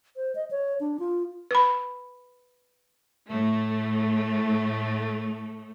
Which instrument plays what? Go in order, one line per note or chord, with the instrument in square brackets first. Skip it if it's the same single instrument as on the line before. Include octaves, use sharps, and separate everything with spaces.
[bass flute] C5
D#5
C#5
D4
F4
[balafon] B4 B5
[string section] A2 A3